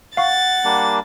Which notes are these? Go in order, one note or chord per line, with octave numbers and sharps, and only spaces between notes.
F5 F#5 C#6 A6
G3 A#3 D4